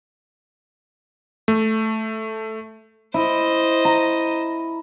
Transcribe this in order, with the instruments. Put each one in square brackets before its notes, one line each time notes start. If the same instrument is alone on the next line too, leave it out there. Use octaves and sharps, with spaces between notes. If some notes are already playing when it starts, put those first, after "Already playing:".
[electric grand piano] A3
[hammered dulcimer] E4 [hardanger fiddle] C5 D#5
[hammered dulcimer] A#5